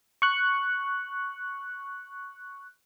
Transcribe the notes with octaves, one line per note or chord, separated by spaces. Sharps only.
C#6 F#6